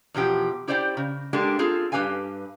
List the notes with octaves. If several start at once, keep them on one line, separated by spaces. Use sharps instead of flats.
E2 B2 F3 G4
E4 G4 C5 D5 F#5 G5
C#3
G#3 A#3 D4 G4 A4
C4 F4 G#4 A4
G2 G#3 G4 B4 F5 G#5